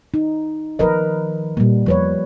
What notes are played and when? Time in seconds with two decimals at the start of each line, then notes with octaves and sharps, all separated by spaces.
0.14 D#4
0.79 D#3 F3 A#4 B4 D#5
1.57 A#2 G3 A#3
1.86 E2 F3 B4 C#5